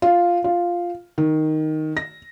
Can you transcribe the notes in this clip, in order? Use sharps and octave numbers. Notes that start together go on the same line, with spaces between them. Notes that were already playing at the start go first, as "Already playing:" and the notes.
F4
F4
D#3
A#6